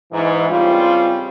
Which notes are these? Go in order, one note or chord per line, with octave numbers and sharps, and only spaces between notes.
G#2 E3
C#3 G3 C4 F4